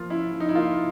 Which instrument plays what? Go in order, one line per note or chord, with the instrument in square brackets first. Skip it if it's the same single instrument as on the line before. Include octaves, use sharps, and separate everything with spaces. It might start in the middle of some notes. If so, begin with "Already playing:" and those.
Already playing: [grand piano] F3 A#3 F4
C#4 E4
F3
D#4
E4
A#3 F4